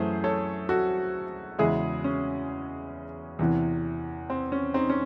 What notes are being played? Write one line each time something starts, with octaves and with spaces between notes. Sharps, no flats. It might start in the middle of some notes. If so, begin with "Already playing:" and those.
Already playing: F#2 E3 A3 G#4 C5
A4 C#5
F#4 A4
E2 C#3 G#3 E4 G#4
C#4
E2 C3 E3
C4
C#4
C4 D#4
C#4